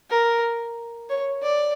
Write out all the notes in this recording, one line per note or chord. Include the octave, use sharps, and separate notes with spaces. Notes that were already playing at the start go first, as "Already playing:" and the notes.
A#4
C#5
D5